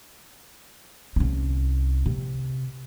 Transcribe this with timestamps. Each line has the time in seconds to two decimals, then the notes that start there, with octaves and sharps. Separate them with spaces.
1.16 C2 C#4
2.06 C3